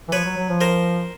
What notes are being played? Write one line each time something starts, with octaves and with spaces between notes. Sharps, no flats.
E3
F3 B4 C#5
F#3
F#3
F3
A#4 C5